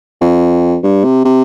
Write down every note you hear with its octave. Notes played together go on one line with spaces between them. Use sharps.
F2
G2
C3
C3